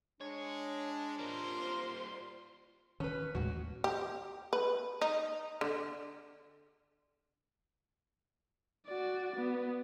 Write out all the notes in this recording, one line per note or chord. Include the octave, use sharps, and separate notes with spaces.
G#3 D4 C#5
G3 A#3 F4 A#4 C5 C6
D#3 C#4 B4
D#2 A2 G#3 F#4
G4
B4
D#4
D3
F#4 D5
B3